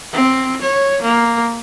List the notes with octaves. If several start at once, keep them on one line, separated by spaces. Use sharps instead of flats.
C4
C#5
A#3